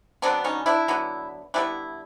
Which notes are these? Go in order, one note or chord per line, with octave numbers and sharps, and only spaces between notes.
D3 F#3 B3 C4 D4
C#4 D#4
D4 E4
D3 F#3 B3
D3 G3 B3 D4 E4